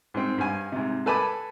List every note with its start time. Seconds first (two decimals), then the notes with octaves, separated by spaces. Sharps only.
0.14 G#2 C4
0.38 G2 G#5
0.72 G#2 C3
1.06 A4 B4 G#5 A5 B5 D6